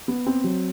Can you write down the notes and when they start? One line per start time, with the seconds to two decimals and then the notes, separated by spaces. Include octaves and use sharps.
0.08 B3
0.26 C4
0.44 F#3